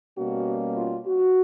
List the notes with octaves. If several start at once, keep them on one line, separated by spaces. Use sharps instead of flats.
B2 G3 A#3 C#4 F#4
F4
F#4